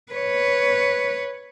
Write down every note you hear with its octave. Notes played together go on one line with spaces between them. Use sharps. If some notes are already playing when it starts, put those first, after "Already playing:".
B4 C#5